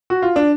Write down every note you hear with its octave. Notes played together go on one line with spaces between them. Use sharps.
F#4
F4
D4